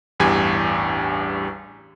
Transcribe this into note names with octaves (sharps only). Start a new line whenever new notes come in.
A1 E2 G2 G4 G#5 G#6